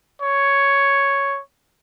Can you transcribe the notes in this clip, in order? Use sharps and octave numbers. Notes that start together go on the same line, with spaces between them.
C#5